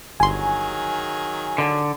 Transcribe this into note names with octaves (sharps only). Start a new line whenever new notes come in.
G1 D#3 F#3 G#4 G#5 C6
D3